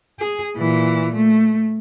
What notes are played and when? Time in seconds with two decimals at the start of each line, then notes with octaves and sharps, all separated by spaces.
0.19 G#4
0.56 A#2 E3
1.14 A3